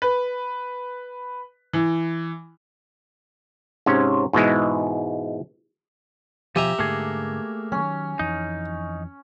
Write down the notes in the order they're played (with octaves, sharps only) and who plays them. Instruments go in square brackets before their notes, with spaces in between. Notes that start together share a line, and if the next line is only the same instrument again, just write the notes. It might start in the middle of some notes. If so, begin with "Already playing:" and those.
[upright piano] B4
E3
[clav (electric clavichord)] G#2 C3 C#4 C#5
G#2 B2 E3 G#3
[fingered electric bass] B2 [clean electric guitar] F3 G#5 [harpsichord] G4 E5 A#5
[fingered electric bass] G#2 D3 [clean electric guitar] A3 A#3 G#4
[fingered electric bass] D#3 F#3 [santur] C#4
[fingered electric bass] F2 E3 [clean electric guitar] D#4